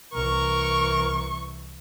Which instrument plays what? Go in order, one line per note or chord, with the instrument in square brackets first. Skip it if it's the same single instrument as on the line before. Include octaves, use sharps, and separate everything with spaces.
[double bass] C2 E3 [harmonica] A#4 [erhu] C#6